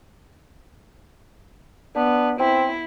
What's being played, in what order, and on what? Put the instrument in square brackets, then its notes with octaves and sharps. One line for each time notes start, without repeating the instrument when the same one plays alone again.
[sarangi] B3 [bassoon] D4
[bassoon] C4 [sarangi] E4